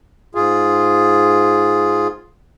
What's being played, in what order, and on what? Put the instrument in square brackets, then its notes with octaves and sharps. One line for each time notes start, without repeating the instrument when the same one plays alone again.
[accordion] G#2 F4 G#4